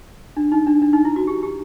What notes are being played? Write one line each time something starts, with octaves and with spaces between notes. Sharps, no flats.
D4
D#4
D4
D4
D#4
E4
F#4
G4
G4